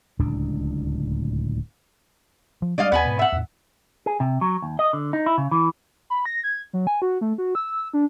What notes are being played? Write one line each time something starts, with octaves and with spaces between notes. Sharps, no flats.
D1 C#2 A2 D4
F3
G3 G#3 D4 D5 D#5 F5
D#2 B3 B4 G#5
G#2 B2
E5 F#5
E2 A2
G#4
C3
F#3
D#2
D#5
D3
D#4
E4
C#3
E3
B5
A#6
G#6
F#3
G#5
F#4
A3
F#4
E6
D4